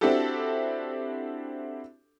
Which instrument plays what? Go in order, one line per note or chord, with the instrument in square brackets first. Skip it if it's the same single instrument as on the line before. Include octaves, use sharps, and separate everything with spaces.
[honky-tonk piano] C4 D4 E4 F#4 G4 A4